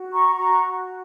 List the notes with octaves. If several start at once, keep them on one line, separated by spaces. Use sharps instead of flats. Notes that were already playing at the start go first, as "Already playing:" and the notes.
Already playing: F#4
A#5 C#6
F#4 A#5 C#6